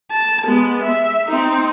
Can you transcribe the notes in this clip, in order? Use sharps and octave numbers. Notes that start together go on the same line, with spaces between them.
A5
G#3 B3
E5
C4 D#4